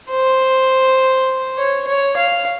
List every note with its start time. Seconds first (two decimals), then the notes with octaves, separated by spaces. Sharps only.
0.11 C5
1.58 C#5
1.88 C#5
2.17 F5